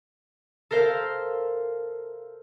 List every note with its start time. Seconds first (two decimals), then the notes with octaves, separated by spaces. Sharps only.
0.71 A4 A#4 C5 E5 F5